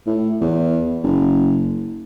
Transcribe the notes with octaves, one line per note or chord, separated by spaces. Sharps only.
A2
E2
F#1